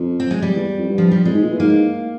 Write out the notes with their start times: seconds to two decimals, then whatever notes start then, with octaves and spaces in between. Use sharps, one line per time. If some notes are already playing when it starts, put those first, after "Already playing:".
Already playing: F2
0.20 C4
0.31 G#3
0.42 G3
0.55 E2
0.78 F2
0.89 G2
0.98 F3
1.11 G3
1.24 F2 G#3
1.33 G#2
1.42 A#2
1.51 E3
1.59 G#2 A#3